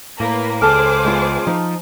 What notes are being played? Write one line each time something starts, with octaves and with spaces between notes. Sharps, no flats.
A2 A#3 B4
C#2 G#4 A4 C5 A5 D6 F6
G#3 B3 F4
F3 D#4